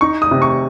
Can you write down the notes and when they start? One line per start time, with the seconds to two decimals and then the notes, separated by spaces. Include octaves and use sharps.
0.01 D#4 C#6
0.22 D#6
0.31 C3
0.42 C#6